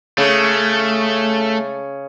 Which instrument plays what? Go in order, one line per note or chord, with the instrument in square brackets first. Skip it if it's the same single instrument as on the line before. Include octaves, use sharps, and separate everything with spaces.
[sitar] C#3 [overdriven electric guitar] A3